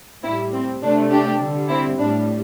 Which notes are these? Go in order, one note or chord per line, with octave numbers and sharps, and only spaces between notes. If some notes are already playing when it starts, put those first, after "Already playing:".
A2 G3 C4 E4
C4
C3 A3 D4
D4 G4
D3 G3
C4 E4
A2 G3 D4